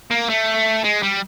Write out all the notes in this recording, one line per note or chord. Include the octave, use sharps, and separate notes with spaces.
A#3
A3
G#3
G3